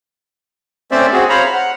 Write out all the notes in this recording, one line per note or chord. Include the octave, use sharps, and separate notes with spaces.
A3 C4 C#4 C5 D5 E5
C4 F#4 G#4
C5 C#5 F5 A#5 B5
F#5